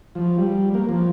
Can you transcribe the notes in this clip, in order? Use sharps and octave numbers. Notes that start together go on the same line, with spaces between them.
F3
G3
A#3
F3